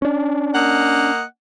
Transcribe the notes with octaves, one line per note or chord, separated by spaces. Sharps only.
C#4 D4
A#3 D#5 F#5